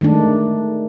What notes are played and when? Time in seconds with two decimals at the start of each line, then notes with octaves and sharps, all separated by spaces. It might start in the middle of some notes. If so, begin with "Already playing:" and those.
0.01 D#3 G#3 A3 D4